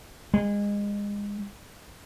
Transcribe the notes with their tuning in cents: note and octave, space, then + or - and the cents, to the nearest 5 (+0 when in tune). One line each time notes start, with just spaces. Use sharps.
G#3 -25